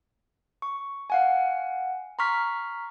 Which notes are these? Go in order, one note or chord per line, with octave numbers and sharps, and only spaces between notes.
C#6
F5 F#5 G#5
A#5 C6 C#6 F6 B6